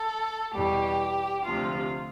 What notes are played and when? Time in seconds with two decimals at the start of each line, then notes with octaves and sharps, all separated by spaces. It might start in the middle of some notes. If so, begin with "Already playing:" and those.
Already playing: A4
0.54 E2 B2 G3 G4
1.45 D2 C3 F3 F4